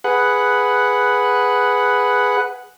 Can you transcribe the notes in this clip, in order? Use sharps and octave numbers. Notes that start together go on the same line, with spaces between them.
G#4 B4 F#5